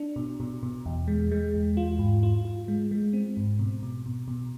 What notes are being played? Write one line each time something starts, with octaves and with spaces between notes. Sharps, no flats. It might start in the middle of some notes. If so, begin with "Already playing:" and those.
Already playing: D4
B2
B2
B2
E2
G#3
G#3
E2
F4
G#2
F4
F4
G#3
G#3
C4
G#2
B2
B2
B2
B2